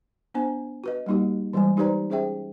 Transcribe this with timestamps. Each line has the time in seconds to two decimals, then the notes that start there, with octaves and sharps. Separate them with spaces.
0.34 B3 D4 C5 G#5
0.84 F#4 B4 D#5
1.06 G3 A#3 D#4 F#4 G4
1.53 E3 G3 G#3 C5 G#5
1.77 D#4 G4 B4 C5 D5 A#5
2.10 C#4 G#4 C5 E5 G5